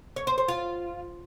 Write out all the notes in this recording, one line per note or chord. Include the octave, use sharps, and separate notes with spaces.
C#5
C5
C5
F4